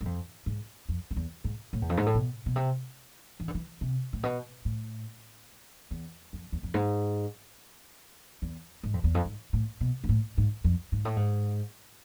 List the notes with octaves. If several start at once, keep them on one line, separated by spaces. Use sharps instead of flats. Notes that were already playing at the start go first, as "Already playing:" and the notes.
G#2
F2
G#2
F2
F2
E2
G#2
A2
E2
F2
G#2
A2
B2
B2
C3
E3
D3
E3
C3
A2
B2
A2
E2
F2
E2
F2
G#2
E2
G#2
F2
E2
F2
G#2
A2
B2
G#2
A2
G#2
F2
G#2
A2
G#2